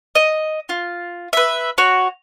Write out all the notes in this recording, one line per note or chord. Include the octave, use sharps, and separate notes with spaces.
D#5
F4
B4 E5
F#4 C#5